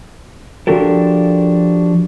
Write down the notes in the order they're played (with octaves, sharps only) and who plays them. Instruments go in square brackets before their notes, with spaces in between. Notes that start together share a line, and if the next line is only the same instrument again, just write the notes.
[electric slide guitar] F3 D4 F#4 G4 A4 A#4